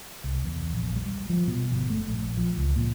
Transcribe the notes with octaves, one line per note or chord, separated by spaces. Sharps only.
C2
E2
A#1
G3
F3
B2
G1
A3
A#1
F3
C#2
A#2